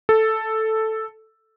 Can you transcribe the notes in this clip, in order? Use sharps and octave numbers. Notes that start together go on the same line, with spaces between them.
A4